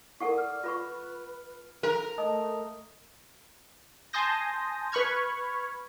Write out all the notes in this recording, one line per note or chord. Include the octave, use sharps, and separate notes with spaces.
E4 A4 A#4 D5 F#5 C#6
F6
F4 B4 B5 C#6
A4 A#4
A3 D#5 A5 D#6
G#5 A5 C6 D#6 G6 A#6
B4 B5 C#6 F6 G#6